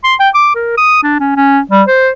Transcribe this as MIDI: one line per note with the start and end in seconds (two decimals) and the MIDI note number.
0.04 0.15 84
0.19 0.29 79
0.34 0.50 86
0.55 0.74 70
0.77 1.02 87
1.03 1.18 62
1.20 1.32 61
1.37 1.59 61
1.71 1.82 55
1.88 2.10 72